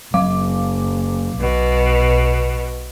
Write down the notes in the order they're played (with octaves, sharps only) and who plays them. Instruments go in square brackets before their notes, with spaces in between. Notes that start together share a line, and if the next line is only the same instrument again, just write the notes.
[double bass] F#1 [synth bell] F#3 F5 D6
[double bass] B1 [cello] B2